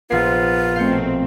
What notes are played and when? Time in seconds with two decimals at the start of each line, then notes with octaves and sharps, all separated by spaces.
0.11 A#1 B3 F4 C7
0.76 B2 A3 C4 F5 G6 C#7